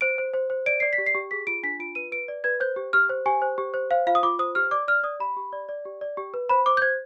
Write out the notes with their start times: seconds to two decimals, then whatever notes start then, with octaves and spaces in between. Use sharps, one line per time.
0.01 C5 D7
0.18 C5
0.33 C5
0.50 C5
0.66 D5 D7
0.80 D5 C7
0.93 B6
0.98 G4
1.06 C7
1.15 G4
1.31 G#4 B6
1.47 F4 D7
1.63 D4 B6
1.79 F4 D7
1.95 B4 D#7
2.12 B4 D7
2.28 D5
2.44 B4 G#6
2.60 C5 G6
2.76 G4
2.93 G4 F6
3.09 C5
3.26 G4 G#5
3.42 C5
3.58 G4
3.74 C5
3.91 C5 F5
4.07 F4 F5
4.15 D#6
4.23 F4 D6
4.39 C5 D#6
4.55 G4 F6
4.71 D5 D6
4.88 D5 F6
5.03 D5 D#6
5.20 G4 B5
5.36 G4
5.53 D5
5.69 D5
5.85 G4
6.01 D5
6.17 G4
6.34 B4
6.49 C5 B5
6.66 C5 D6
6.77 G6
6.82 C5 G#6